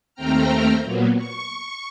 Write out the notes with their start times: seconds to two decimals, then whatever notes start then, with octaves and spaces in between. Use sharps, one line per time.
0.14 D#2 A3 C4 G5 A#5 F6
0.83 A#2 F#3 A#3 B3
1.17 C#6